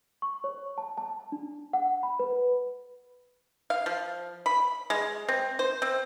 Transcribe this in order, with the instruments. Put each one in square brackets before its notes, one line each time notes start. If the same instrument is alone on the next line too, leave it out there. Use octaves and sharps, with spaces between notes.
[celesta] C#6
C#5
A5
A5
D4
F#5
B5
B4
[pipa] F5
F3
B5
G#3
C4
C5
C4